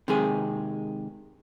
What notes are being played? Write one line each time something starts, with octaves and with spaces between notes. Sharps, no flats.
C3 D#3 G#3 G#4